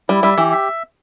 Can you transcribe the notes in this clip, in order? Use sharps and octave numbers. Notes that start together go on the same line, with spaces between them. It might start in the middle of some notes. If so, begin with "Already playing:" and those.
G3 E4
G3 E5
E3 G4
E5